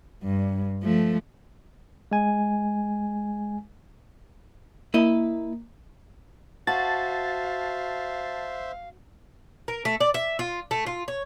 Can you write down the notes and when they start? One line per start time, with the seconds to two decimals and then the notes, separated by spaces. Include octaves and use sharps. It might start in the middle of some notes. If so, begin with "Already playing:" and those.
0.23 G2
0.83 F3 A3
2.11 G#3 G#5
4.94 A#3 E4 D#5
6.67 F#4 C5 E5 F5 A5 A6
9.68 A#4
9.85 A3
10.00 D5
10.14 E5
10.39 F4
10.71 A3
10.86 F4
11.08 C#5